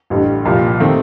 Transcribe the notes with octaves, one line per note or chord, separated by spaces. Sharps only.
A1 G2 D3
C2 A#2 F3
D#3 A3 C4 D#4